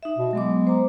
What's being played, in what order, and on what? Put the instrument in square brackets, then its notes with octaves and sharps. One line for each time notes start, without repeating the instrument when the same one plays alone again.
[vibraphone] D#4 E5
[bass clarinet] B2
[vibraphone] F#3 B3 D6 [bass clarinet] G#3
[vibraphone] C5 A#5